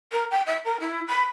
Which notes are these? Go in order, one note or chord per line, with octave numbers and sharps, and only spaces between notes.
A#4
G5
E5
A#4
E4
B5